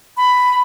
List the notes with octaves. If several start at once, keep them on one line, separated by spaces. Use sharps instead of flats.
B5